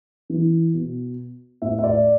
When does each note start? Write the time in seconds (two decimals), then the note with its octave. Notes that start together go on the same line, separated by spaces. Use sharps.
0.30 E3
0.74 B2
1.62 A2 E5
1.79 E5
1.84 D5